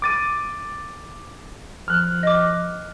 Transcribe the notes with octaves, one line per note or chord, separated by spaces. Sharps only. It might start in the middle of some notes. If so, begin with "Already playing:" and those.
D6 A6 D#7
F3 F6 F#6
D#5 D6